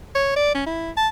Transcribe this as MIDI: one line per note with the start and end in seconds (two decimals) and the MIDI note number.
0.15 0.35 73
0.36 0.53 74
0.55 0.64 61
0.66 0.91 64
0.97 1.08 81